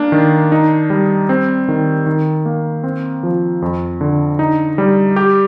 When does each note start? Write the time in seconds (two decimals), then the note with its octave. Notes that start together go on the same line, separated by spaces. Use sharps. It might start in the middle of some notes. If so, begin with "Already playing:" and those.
Already playing: A#3 D4
0.12 D#3
0.52 D#4
0.90 G3
1.29 C4
1.68 D#3
2.06 D#3
2.46 A#3
2.84 C4
3.23 F3
3.62 F2
4.01 D3
4.39 D#4
4.78 G3
5.16 G4